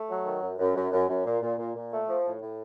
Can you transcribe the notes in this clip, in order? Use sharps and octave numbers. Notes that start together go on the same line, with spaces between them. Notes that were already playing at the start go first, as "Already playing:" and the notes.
Already playing: A3
F#3
D#3
F#2
F#2
F#2
F#2
F#2
A#2
A#2
A#2
A#2
A3
F3
A2
A2